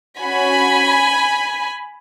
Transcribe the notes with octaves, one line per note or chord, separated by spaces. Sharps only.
C#4 F#4 G#5 B5